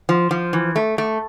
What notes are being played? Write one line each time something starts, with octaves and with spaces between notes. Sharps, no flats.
F3
F3
E3
A3
A3